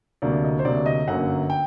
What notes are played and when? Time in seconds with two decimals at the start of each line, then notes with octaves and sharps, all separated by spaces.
0.22 D2 C3 F#3 A#3 D5
0.44 D#5
0.59 C5
0.65 D2 C3 F#3 A#3 D5
0.86 D#5
1.08 G1 F#2 F#3 A#3 F#5
1.50 G5